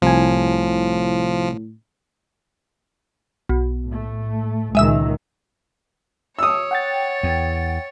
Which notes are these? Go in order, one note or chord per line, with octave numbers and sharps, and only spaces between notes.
C2 A2 F3 G#5
B1
A2 A3
C#2 A#2 D#3 G#3 E5 E6
C#5 D#6 E6
F#5 G5 A6
E2